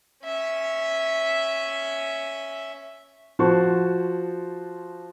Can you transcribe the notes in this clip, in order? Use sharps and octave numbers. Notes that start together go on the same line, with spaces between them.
C#4 E5
F3 F#4 C5 A5 C#6